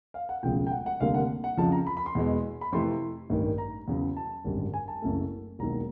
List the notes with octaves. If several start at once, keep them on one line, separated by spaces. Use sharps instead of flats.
F5
F#5
E1 D2 C#3 F3 G5
G5
F#5
F#5
F1 D#2 D3 G3 A#3 F5
F#5
F#5
F2 C#3 F3 A5
A#5
B5
B5
C6
E2 B2 G#3
B5
F2 C3 E3 A3 C6
A1 G2 D#3
A#5
E2 C#3 F#3
A5
G#1 F#2 D3 G3
G#5
A5
F#1 F#2 C#3 E3 A3
E1 D#2 D#3 F#3 A#5